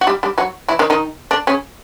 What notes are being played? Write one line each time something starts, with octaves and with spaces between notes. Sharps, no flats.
F#4
G3 G4
G3 G4
F#3 F#4
E3 E4
D#3 D#4
D#3 D#4
D3 D4
C#3 C#4